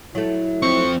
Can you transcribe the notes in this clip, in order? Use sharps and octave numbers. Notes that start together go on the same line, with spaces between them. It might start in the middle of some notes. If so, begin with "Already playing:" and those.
F#3 A3 E4
F3 C4 C#6